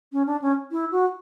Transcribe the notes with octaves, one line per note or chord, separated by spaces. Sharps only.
C#4
D4
C#4
E4
F#4